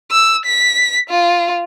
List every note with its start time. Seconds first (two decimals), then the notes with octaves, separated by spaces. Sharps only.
0.12 E6
0.46 B6
1.10 F4